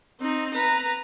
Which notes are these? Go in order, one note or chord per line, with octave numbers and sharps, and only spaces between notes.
C4 D#4
B4 A#5